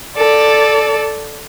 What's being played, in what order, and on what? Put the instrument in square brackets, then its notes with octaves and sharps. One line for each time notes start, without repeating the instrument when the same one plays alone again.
[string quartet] A4 D5